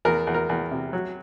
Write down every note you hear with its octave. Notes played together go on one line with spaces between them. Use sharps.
E2 A#4
E2
A#4
E2
C3
F#3